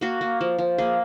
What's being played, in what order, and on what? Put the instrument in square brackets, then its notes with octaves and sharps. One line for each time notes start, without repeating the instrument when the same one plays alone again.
[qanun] A#3 F#4
A#3
F3
F3
A#3 G#4